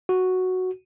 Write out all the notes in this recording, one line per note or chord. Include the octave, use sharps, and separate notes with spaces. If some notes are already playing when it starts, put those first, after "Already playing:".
F#4